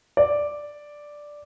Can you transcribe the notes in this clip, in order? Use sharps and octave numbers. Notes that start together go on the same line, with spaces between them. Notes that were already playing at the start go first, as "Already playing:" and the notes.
D5